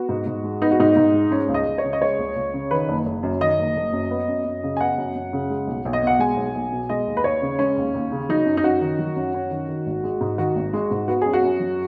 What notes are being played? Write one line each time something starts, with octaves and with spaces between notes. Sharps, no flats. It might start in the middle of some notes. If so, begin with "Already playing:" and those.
Already playing: B3 F#4
G#2
G#2
G#3
B3 D#4
F#4
G#2 D#4
G#2
G#3
G#3 C#4
C#2
D#5
C#2
C#5
C#3
D#5
G#3 C#5
C#2
C#2
C#3
D#3 B4
F#1
F#1
F#2
D#3 D#5
F#1
F#1
F#2
B3
F#2
F#2
C#3
G#5
B3 F#5
F#2
F#2
C#3
G#3
B1
B1
D#5
B2 F#5
G#3 G#5
B1
B1
B2
G#3 D#5
D#2
B4
D#2 C#5
C#3
G#3 C#4
D#2
D#2
C#3
F#3 D#4
F#2
D#4
C#4 F#4
D#3
F#3
F#2
C#4
D#3
D#3
G#1
G#3
G#2
D#3 F#4
G#1
G#3
G#2
B3 F#4
F#2 G#4
F#4
F#2
F#3